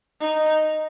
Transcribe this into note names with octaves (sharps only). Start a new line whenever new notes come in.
D#4